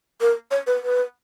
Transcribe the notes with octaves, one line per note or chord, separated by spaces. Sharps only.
A#4
C#5
B4
B4